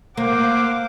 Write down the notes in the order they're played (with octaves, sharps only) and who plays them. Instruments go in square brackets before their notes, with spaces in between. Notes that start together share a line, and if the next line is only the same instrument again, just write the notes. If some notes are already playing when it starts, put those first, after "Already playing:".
[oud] A#3 [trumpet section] C5 F5 F#5 [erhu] D6